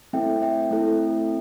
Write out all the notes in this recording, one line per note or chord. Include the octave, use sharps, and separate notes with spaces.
A3 C4 E4 A4 E5 G5
E5 G5
A3 C4 E4 A4